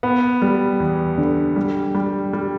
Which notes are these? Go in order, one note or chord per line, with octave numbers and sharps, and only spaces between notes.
B3
G3
E2
D3
G3
G3
G3